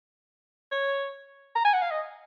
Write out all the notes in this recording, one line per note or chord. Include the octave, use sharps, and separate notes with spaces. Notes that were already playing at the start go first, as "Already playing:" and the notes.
C#5
A#5
G#5
F#5
F5
D#5